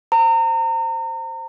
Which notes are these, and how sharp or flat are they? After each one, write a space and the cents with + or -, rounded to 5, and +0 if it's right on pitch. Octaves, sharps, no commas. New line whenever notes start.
C5 +5 A#5 -35